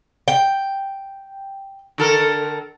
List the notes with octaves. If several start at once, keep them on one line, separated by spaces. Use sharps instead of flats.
G5
D3 A4 A#4